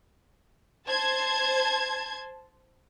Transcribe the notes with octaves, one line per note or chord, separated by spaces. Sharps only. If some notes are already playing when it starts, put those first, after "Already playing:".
C5 A5 G#6